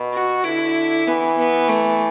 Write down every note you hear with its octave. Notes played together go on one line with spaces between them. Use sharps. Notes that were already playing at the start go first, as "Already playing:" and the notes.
Already playing: B2
F#4
D3 E4
E3 B3
B3
A3